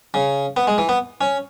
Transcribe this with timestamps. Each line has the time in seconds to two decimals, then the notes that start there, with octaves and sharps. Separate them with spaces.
0.14 C#3
0.57 B3
0.67 G#3
0.78 E3
0.89 B3
1.21 C#4